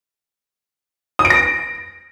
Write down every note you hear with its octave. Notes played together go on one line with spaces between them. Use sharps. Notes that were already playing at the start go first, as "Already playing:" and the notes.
D#6
D7
A#6